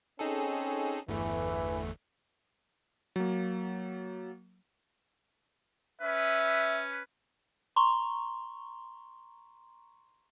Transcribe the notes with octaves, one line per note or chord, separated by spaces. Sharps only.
C4 C#4 D#4 G#4 A4
G1 E2 E3 A3
F#3 A#3
C#4 B4 E5
A#5 C6 C#6